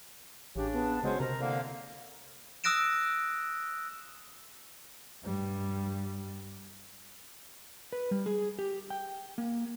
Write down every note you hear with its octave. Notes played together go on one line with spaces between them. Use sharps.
A1 C#3 D4 G4
B3 A5
C#3 F#3 G#3 C#4 C5
C3 A#4 C5 A#5
C2 D3 A#3 F5
D#6 E6 F#6 A#6 D7 E7
G2 G3
B4
G3
G#4
G4
G5
A#3